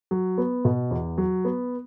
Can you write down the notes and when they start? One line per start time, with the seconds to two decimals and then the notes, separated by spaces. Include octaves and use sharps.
0.11 F#3
0.38 B3
0.65 B2
0.91 E2
1.18 F#3
1.45 B3